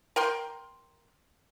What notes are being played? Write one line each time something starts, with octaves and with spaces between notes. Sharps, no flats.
A#4 G5 C6